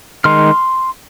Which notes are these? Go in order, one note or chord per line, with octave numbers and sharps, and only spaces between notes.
D#3 G#3 D#4 C6 F6